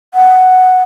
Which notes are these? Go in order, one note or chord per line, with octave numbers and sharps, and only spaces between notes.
F#5